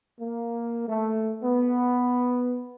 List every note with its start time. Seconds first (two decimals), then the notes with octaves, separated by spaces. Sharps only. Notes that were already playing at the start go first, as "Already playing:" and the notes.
0.21 A#3
0.88 A3
1.43 B3